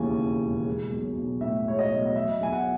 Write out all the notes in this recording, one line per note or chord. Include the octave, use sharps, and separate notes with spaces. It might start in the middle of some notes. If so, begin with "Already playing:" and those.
Already playing: E1 D#2 C#3 E3 G#5
C#3
E1
G#3
B1
B1
A2 E5
G#3 C#5
D#5
B1
D#5
F#3 E5
E2 G#5
F#5